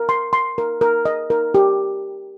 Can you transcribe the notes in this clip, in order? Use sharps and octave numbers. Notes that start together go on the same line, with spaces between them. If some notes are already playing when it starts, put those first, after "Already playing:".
Already playing: A#4
C6
C6
A#4
A#4
D#5
A#4
G4